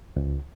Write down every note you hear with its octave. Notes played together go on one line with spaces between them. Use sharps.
C#2